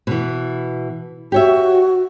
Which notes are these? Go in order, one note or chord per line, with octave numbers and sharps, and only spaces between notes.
B2 E3
F#4 G4 C#5 E5